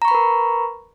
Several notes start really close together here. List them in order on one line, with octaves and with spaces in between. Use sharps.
A#5 C#6 B5 B4 A#4